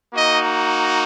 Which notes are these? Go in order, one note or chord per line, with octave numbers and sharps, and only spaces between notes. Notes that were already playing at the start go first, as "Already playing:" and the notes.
A#3 D#4 F#4 D#5